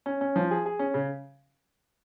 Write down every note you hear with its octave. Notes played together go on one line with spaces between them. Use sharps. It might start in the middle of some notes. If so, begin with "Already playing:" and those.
C#4
C#4
F3
G#4
G#4
C#4
C#3